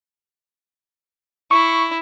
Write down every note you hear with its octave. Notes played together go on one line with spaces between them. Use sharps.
E4 C#6